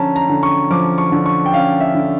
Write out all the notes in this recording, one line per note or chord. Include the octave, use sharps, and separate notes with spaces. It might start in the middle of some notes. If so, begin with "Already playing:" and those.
Already playing: D3 F3 C#4 A5 A#5
A#5
D3
C#6
F3 D6
C#6
D3
C#6
G5
C#4 F5
E5
D3